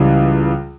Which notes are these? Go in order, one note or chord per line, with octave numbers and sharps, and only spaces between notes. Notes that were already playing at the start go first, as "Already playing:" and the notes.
Already playing: C#2 C#3 E3 G3